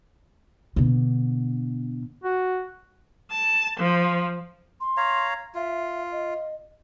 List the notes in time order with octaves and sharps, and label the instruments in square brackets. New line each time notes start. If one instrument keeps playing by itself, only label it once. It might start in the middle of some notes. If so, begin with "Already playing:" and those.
[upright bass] B2 D3
[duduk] F#4
[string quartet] A5
F3
[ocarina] C6
[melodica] C#5 F5 A#5
[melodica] F4 [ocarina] E5
[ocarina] D#5